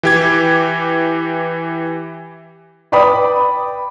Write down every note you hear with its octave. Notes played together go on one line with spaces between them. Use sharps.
E3 G4 G#6
B4 D5 G5 B5 D6 D#6